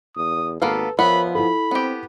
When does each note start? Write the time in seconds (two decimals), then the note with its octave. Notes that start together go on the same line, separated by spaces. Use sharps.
0.17 E2 D#6
0.62 G#1 A#3 B3 A4 B4 F5
0.99 F3 B3 A#4 C#5 E5 F#5 B5
1.35 E4 A4 B5
1.71 B3 C4 G4